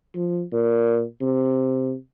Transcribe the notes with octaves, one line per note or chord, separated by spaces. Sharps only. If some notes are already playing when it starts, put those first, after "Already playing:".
F3
A#2
C3